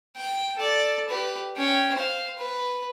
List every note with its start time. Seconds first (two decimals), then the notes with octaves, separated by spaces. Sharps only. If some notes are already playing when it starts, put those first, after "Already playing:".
0.16 G5
0.56 A4 D5
1.09 G4 B4
1.57 C#4 G5
1.94 C5 F5
2.38 B4